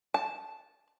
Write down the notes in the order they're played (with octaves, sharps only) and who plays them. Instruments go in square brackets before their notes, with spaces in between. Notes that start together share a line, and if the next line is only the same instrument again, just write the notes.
[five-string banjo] A5